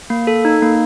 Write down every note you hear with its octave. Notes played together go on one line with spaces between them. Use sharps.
A#3
A4
D#4
A#3